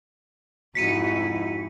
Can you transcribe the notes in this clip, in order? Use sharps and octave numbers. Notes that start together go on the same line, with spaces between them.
F2 G#2 D#4 E4 F#4 B6 C#7 D#7